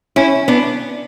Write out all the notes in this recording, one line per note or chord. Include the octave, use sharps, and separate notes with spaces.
C#4 E4
B3 D4